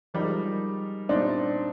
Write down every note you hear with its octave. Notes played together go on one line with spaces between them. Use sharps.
F3 G3 G#3 D#4 A#4
A#2 G3 C4 D4 D#4